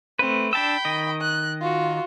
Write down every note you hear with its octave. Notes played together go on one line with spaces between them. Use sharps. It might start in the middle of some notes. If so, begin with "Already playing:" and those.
A3 C4 B4
D4 G5 A5 B5 E6
D#3 D#5
F#6
F4 F#4